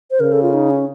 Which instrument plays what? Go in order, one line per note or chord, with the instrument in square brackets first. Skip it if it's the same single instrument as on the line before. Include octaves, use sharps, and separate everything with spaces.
[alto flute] C5
[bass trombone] C#3 [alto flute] A#4
[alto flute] A4
F4
D#4
C#4